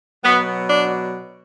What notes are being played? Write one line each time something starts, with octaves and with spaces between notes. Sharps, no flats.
B2 F#3 B3
D4